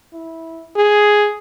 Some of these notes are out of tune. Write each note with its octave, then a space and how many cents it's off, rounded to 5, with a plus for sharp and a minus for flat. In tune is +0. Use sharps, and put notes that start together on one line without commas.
E4 -10
G#4 +5